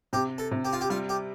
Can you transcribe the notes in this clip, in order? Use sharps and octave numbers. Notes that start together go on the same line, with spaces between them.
C3 G4
A4
C3
G4
F4
G4
G3 F4
G4